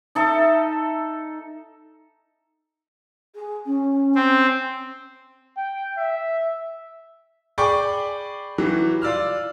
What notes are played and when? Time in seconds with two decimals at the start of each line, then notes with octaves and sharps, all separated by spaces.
0.15 D#4 A4 E5
3.35 G#4
3.66 C#4
4.15 C4
5.57 G5
5.97 E5
7.58 G#4 D5 G5 B5 C#6 D6
8.58 E3 F#3 G3
9.02 F4 D5 E6 F6